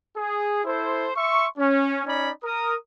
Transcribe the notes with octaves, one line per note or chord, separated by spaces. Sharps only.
G#4
E4 A4 C5
E5 C6 C#6
C#4
C#4 D#4 C#5 D5 B5
A#4 D#6